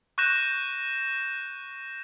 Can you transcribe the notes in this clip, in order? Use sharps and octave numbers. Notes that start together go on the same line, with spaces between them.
C#6 F#6 G6 A#6 E7